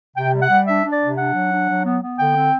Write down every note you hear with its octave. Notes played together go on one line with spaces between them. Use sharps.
C3 G5
G3
F#5
G3
D4 E5
D4
D5
C3
D4 F#5
F#3
D4
F#3
B3
B3
D3 G5
C4